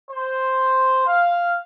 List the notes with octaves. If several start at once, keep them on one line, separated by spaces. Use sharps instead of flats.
C5
F5